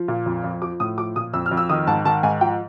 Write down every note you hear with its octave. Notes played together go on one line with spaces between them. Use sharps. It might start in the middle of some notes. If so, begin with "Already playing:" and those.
Already playing: F3
A#2
F2
F2
F3 D6
A2 D#6
F3 D6
A#2 D#6
F2 E6
F6
F2
E6
D#3 D#6
G#2 A5
D#3 A5
G#2 G#5
F3 G5